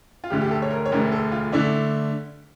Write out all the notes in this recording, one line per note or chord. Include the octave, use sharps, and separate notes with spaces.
F4
E1 D2 D3 A3 G4
G4
A4
C#5
A#4
C#5
E1 D2 D3 A3 A#4
A4
F4
D3 A3 D4 E4